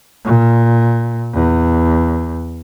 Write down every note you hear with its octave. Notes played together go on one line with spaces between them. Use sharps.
A#2
E2